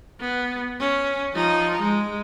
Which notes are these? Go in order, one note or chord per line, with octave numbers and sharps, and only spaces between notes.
B3
C#4
F3 D#4
G#3